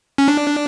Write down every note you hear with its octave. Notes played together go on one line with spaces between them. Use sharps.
C#4
D4